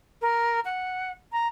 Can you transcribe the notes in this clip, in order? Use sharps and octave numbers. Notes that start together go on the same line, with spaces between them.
A#4
F#5
A#5